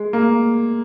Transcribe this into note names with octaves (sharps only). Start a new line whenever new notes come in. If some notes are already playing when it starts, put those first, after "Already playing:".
Already playing: G#3
A#3